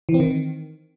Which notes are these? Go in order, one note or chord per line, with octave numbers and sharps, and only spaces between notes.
E3
C4
D#3